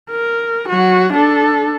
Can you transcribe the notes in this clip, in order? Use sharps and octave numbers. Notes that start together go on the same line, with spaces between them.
A#4
F#3 F#4
D4 A4